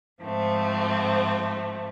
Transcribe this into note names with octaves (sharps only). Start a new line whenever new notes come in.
G#2 F3 A3 C4